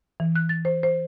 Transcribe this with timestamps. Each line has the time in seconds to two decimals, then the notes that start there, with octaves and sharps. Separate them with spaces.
0.20 E3
0.36 F#6
0.49 A6
0.65 C5
0.83 C5